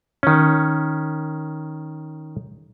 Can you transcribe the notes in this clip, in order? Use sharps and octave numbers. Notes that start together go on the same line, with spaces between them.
D#3 C#4